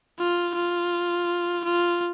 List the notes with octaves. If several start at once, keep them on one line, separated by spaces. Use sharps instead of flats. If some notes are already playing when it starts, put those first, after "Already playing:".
F4
F4
F4